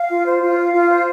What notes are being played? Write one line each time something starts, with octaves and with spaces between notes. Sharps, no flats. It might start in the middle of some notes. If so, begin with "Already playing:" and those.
Already playing: F5
F4
C5
F4
F5
F4
C5